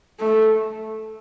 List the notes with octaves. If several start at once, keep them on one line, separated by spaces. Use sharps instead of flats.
A3